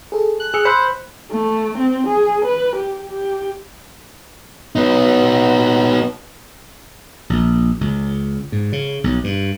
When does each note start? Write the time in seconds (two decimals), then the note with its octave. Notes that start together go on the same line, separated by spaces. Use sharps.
0.12 G#4 A4
0.40 F#6
0.54 G#4 E6 C#7
0.65 C5 B5 C6 F#6
1.32 A3
1.77 C4
2.07 G#4
2.45 B4
2.76 G4
3.10 G4
4.76 B3 D#4
7.30 A#1
7.81 C#2
8.52 G#2
8.73 C#3
9.04 B1
9.24 G2